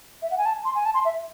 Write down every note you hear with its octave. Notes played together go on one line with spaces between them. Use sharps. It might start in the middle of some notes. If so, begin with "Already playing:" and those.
E5
F#5
G#5
A5
C6
G#5
A5
C6
E5